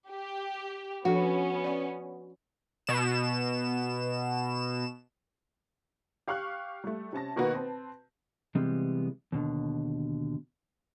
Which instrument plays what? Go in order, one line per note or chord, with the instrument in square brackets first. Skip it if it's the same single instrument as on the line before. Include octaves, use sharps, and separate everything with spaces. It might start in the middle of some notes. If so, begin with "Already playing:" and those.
[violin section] G4
[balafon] F3 D4 A4 [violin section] B3 C#4 [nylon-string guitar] F#4
[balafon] D5 F#5
[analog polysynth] B2 E7
[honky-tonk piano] G4 F5 C#6 F6 F#6
G3 A3
C3 C#4 A5 A#6
B2 D#3 A#3 B3 F#4 B4
C4 B4 A5
[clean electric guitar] C3 E3 G3 G#3 B3 C4
D#2 B2 D3